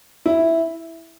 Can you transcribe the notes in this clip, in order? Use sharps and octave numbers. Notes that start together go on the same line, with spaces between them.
E4